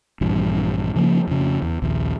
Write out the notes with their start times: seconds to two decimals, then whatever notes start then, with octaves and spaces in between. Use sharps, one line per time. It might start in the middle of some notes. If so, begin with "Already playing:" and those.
0.21 A#1 G2 E3
0.96 C#3 F3 F#3 A#3
1.27 F2 C#3
1.62 E2
1.82 A#1 D#2